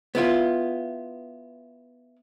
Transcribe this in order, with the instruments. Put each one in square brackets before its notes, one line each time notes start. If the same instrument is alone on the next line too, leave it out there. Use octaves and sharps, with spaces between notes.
[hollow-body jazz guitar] B3 E4 F4